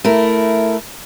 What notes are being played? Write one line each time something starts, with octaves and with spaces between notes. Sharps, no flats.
A3 E4 A#4